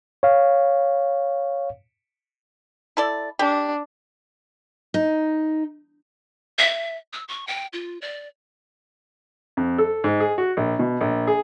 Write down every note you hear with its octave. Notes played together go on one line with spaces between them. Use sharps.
C#5 F5
E4 A4 D5
D4 G4
D#4
E5
E6
C#6
G5
F4
D5
F2
A4
G#2
G#4
F#4
A#1
B2
A#1
G#4